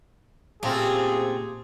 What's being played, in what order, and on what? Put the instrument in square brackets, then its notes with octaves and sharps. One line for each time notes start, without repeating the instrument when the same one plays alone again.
[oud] A#2 C#3 [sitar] A3 C4 F4 [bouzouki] G4 [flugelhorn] G#4